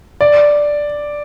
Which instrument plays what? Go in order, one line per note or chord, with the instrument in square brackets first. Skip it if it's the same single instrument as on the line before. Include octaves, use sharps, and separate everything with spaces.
[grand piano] D5